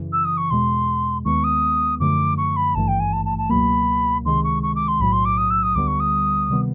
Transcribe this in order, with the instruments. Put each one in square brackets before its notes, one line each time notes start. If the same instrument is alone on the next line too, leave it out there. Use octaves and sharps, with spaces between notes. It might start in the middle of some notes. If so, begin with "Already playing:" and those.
Already playing: [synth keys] F#2 C#3 E3
[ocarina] E6
D#6
C#6
[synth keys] E2 B2 G#3 [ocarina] C6
[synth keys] D#2 D#3 G#3 B3 [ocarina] C#6
[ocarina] D#6
[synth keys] F#2 D3 F3 A3 [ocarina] D6
[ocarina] C#6
B5
[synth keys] G#1 G2 E3 A3 [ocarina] A5
[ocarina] G5
G#5
A5
A5
A5
[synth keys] C#2 B2 F#3 A#3 [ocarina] B5
[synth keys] C#2 C3 D#3 G#3 [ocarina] C6
[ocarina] C#6
C#6
D6
C6
[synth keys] B1 A2 F#3 [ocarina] B5
[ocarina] C6
D6
D#6
E6
D#6
[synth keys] D2 D3 G3 B3 [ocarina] D6
[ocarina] C#6
D#6
[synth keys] C3 D#3 G3 B3